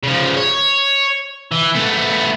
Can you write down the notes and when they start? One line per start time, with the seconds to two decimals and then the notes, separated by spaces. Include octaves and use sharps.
0.03 C#3 F3
0.36 C#5
1.52 E3
1.75 A3 B3